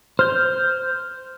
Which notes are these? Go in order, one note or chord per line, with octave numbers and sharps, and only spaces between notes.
C5 F6 G6